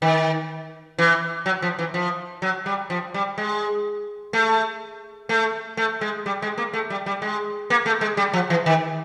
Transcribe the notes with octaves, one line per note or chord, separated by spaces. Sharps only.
D#3
E3
F#3
F3
E3
F3
F#3
G3
F3
G3
G#3
A3
A3
A3
G#3
G3
G#3
A#3
A3
G3
G3
G#3
A#3
A3
G#3
G3
F3
E3
D#3